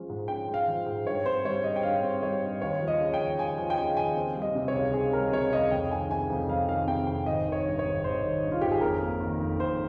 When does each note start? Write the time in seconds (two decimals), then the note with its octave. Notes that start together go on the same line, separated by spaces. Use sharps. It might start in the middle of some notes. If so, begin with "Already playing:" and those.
Already playing: F3 G#3 C#4
0.09 G#2
0.28 C#4 G5
0.48 G#3
0.54 F5
0.68 F3
0.86 G#2
1.06 G2 C#5
1.25 C4 C5
1.44 G3 C#5
1.64 G2 D#5
1.76 G5
1.83 G2 F5
2.03 C4
2.23 G3 C#5
2.42 G2
2.62 D#2 C#5
2.81 F3
2.88 D#5
3.01 C#3
3.14 G5
3.19 D#2
3.38 D#2 G#5
3.58 F3 G#5
3.70 G5
3.78 C#3 G#5
3.97 D#2 G#5
4.16 C4
4.36 G3
4.42 D#5
4.55 C3
4.68 C#5
4.74 C#2
4.94 C4 G#4
5.13 G3 A#4
5.32 C3 C#5
5.53 C#2 D#5
5.71 F2 G5
5.90 D#3 G#5
6.10 C3 G#5
6.30 F2
6.48 F2 F5
6.69 D#3 F5
6.87 C3 G5
7.07 F2 G5
7.26 G#1 D#5
7.46 D#3
7.52 C#5
7.65 G2
7.79 C#5
7.85 G#1
8.04 G#1 C5
8.24 D#3
8.44 G2
8.52 F4
8.61 G#1 G4
8.71 G#4
8.81 F2 A#4
9.01 A#3
9.21 D#3
9.40 F2
9.59 F2 C5